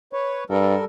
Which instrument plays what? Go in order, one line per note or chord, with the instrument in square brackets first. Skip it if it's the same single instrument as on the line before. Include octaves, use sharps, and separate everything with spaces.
[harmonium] B4 C#5
[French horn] G2 [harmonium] G3 A4 A#4